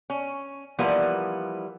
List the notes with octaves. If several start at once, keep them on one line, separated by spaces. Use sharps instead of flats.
C#4
E3 F3 G3 A#3 B3